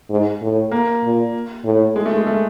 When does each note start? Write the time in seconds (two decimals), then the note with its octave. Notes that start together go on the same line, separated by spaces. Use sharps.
0.10 G#2
0.42 A2
0.72 A#3
1.03 A#2
1.65 A2
1.96 G#3
2.06 A3
2.17 G#3
2.27 A3